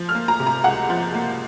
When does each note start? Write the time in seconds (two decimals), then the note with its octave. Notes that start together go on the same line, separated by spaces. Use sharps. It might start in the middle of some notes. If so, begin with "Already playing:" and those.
Already playing: F3
0.09 F6
0.15 A#3
0.28 A#5
0.40 C3
0.47 A#5
0.64 C#2 F#5
0.90 F3
1.14 A#3